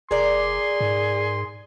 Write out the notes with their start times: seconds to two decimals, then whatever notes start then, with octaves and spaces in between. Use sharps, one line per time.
0.11 F1 G#4 A#4 D5 C6
0.80 G#2